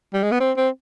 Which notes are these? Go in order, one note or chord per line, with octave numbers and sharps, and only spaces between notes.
G3
G#3
B3
C4
C4